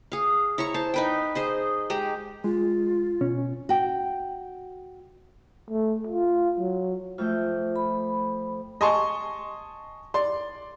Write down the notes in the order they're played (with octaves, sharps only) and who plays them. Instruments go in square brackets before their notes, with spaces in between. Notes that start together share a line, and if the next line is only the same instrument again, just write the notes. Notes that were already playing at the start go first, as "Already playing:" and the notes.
[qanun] G#4 F5
E4 C#5 A#5 C#6
C5 A5
D#4 B4 G5
G#4 C5 D#5
G#3 G4 A#5
[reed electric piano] G#3 [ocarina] F4
[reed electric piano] B2 C#4
[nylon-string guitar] F#4 G5
[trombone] A3
F4
F#3
[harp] F2 A3 G6 [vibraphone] F4
[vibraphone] B5
[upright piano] D#5 G#5 A5 C6 C#6
D5 C6